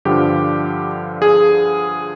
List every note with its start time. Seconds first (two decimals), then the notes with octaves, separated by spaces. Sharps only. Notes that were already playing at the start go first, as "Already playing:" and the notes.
0.05 G2 D3 F3 G4
1.22 G#4